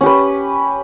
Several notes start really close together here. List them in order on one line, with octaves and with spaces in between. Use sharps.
C#4 G4 B4